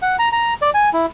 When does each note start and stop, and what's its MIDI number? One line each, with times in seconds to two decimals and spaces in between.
0.02 0.16 78
0.19 0.29 82
0.32 0.54 82
0.62 0.70 74
0.74 0.89 80
0.93 1.06 64